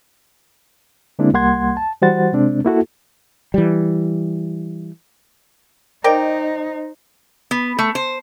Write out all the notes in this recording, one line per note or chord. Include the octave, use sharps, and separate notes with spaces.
D3 G#3 A#3 C4 D4 E4
C2 G3 A#3 F#5 C6 G#6
A5
E3 G3 F#4 C5 F#5 A6
C3 G#3 C4 D4
A#3 E4 F#4 A4
E3 G3
D#4 A#4 C5 D5 D#5 G5
B3
A3
C5